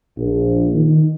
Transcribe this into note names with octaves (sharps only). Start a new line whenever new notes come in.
A#1
D#3